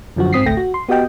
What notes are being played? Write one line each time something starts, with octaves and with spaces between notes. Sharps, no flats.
F#2 D3 F3 F#3 F#4
G#2 C4 D#6 B6 C7
G#1 C#2 A3 G5 A#6
F#4
C6
B3 F#4 G4 D#5 G5